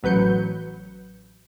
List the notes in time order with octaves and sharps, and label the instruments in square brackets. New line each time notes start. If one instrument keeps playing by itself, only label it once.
[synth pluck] A1 F#3 B4 G6 C#7